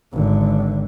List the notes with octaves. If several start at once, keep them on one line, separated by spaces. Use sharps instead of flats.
G#1 D3